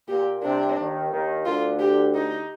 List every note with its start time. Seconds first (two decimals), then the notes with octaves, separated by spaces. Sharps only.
0.08 A#2 G4
0.42 C2 C3 D4
0.77 D#2 D#3
1.11 D#2 D#3
1.46 D2 D3 F4
1.80 G4
2.14 D#4